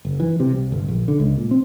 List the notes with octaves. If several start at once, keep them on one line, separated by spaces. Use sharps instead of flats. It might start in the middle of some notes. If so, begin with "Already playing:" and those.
F#1
E3
C3
C2
G1
A#1
D3
C#2
A#2
C4